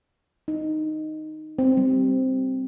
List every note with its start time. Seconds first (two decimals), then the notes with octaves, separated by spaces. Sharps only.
0.48 D#4
1.59 C4
1.77 G3